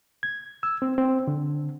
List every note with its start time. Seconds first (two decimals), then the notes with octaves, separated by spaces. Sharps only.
0.23 G#6
0.63 E6
0.82 C4
0.98 C4
1.28 D3